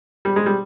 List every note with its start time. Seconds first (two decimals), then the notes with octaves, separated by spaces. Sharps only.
0.25 G3
0.36 G#3
0.46 G3